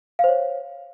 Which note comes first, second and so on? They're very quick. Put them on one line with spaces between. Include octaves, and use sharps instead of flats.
F5 C5 C#5